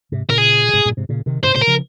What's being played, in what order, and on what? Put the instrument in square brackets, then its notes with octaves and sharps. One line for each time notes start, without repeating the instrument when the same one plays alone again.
[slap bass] G#2 C3
[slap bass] A#2 C#3 [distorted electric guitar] A#4
[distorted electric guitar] G#4
[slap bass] C#3
G#2 C3
G2 A#2
G#2 C3
A#2 C#3
C3 D#3
[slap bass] G#2 C3 [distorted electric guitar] C5
[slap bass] A#2 C#3 [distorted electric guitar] C5
[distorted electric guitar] A#4
[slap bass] C#3 F3